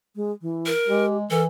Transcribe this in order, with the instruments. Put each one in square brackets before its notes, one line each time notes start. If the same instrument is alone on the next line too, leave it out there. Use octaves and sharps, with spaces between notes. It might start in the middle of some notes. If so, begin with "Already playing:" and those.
[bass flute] G#3
E3
[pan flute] A#4
[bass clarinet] G#3 [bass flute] G4
[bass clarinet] E3 [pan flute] A4 [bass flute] A#4